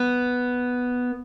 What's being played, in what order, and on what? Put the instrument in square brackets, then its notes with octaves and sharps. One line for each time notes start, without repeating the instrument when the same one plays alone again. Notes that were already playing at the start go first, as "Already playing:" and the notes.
Already playing: [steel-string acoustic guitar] B3